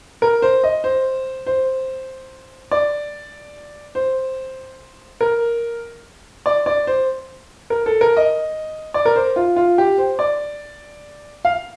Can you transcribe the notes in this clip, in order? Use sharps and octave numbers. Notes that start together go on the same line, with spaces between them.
A#4
C5
D#5
C5
C5
D5
C5
A#4
D5
D5
C5
A#4
A4
A#4
D#5
D5
A#4
C5
F4
F4
G4
C5
D5
F5